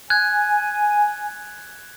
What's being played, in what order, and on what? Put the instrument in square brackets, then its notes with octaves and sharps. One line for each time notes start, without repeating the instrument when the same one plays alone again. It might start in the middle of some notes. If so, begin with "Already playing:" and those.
[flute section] G#5 [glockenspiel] F#6 G#6